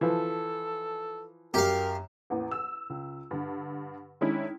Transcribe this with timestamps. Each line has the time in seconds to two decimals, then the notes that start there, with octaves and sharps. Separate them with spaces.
0.01 E3 F3 A4
1.54 F#2 G4 A#4 F5
2.30 A1 E2 A#3
2.51 E6
2.90 C#2
3.31 G2 D3
4.21 D#3 G#3 C#4 D4 E4